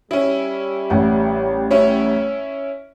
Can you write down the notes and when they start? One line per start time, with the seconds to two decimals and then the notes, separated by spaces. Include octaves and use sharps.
0.11 G3 C#4 E4
0.90 A1 F#5
1.71 C#4 E4 C#5